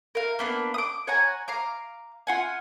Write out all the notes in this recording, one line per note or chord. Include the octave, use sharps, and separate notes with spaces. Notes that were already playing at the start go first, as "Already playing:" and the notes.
A#4 F5
A#3 B3 D4
D6 D#6
C#5 F#5 G#5 A#5
F5 A#5 D6
F4 F#5 G#5